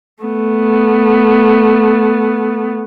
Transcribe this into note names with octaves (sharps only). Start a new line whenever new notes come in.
A3 B3